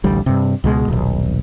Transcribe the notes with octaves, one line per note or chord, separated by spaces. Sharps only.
A1 D2 G3
G2 C3
C#2 B2 G#3
D#1 B1